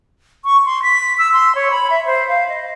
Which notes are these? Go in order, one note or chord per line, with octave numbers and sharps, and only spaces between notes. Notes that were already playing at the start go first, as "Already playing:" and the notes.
C#6
C6
B6
E6
C6
C#5
B5
E5
C5
F5
D#5